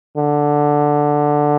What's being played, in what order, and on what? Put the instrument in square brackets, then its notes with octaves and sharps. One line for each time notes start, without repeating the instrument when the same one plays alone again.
[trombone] D3